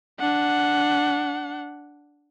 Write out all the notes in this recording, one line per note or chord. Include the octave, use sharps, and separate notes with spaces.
D4 F#5